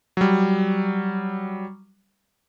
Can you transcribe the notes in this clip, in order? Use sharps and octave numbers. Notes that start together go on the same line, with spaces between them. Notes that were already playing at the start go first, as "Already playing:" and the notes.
F#3 G3